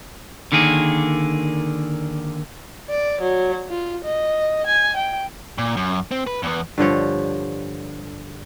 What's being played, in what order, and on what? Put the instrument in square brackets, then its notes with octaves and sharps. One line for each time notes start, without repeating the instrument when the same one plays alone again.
[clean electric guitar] D3 D#3 A#3 G#4
[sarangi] D5
F#3
F4
D#5
G#5
G5
[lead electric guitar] A#2
F#2
C4
B4
E2 B3
[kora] G2 D3 F3 C#5